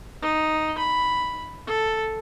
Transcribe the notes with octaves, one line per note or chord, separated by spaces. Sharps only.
D#4
B5
A4